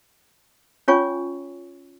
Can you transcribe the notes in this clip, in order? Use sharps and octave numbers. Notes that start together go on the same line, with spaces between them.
C#4 F4 C#5 G#5 C#6